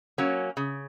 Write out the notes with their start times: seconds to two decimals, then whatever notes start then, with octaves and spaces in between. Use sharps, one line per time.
0.18 F#3 A#3 C#4
0.57 C#3